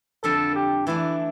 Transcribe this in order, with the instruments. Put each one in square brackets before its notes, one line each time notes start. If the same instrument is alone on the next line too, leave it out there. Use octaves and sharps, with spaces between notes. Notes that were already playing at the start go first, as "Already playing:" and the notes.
[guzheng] F2 D3 G3 D4 [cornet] A4
[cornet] G4
[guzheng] E3 A3 D4 [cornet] E4